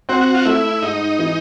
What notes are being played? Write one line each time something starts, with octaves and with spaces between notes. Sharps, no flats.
C4 F#4
F4
A3 E4
G#2 D#4
E3